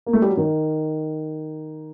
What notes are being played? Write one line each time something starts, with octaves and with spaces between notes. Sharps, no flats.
A#3
A3
G3
F#3
D#3